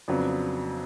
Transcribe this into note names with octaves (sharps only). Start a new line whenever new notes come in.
F2 C#3 F#3 B3 D4